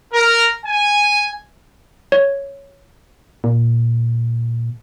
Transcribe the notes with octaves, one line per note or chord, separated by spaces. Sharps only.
A#4
G#5
C#5
A#2